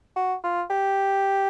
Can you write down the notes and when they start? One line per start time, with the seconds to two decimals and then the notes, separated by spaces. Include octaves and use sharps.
0.16 F#4
0.44 F4
0.70 G4